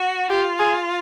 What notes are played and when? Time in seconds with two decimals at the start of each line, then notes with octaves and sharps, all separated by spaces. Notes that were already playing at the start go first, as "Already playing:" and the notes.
Already playing: F#4
0.30 F4 G4
0.59 G#4